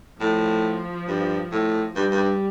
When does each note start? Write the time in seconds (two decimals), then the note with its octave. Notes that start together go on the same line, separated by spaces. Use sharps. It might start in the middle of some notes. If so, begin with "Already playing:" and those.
0.20 A2 F3
1.08 G2
1.52 A2
1.95 G2 G3
2.11 G2